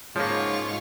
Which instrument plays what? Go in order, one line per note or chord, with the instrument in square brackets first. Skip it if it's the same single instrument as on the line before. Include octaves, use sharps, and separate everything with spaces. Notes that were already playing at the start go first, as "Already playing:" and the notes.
[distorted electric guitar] G#2 [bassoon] C#3 [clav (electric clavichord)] F3 A#3 [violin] F4 C#6